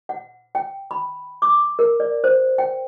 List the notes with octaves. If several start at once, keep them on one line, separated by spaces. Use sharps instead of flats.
F#5
G5
B5
D6
A#4
D5
C5
G5